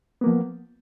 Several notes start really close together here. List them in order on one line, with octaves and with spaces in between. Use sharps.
B3 A#3 F3